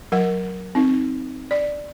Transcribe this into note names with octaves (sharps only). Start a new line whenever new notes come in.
F#3 A#4 F#5
C4 D#4
D5